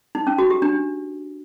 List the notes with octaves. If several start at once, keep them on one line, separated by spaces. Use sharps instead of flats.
D#4
C#4
F#4
G4
D4